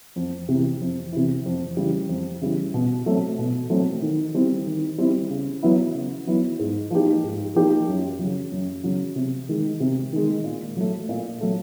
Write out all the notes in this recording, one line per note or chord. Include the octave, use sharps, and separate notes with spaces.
F2
C3 E3
F2
C3 E3
F2
C#3 E3 G3
F2
C#3 E3 G3
B2
F#3 A3 C4
B2
F#3 A3 C4
D#3
G3 C4 E4
D#3
G3 C4 E4
C#3
F#3 B3 E4
C#3
F#3 B3 E4
G#2
F3 A#3 D#4 G4
G#2
F3 A#3 D#4 G4
F#2
C#3 F#3
F#2
C#3 F#3
C3
D#3 G#3
C3
D#3 G#3
A#2
F#3 A3
A#2
F#3 A3